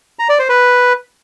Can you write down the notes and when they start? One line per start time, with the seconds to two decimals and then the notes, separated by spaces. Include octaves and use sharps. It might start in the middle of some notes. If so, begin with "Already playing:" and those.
0.19 A#5
0.29 D5
0.39 C5
0.49 B4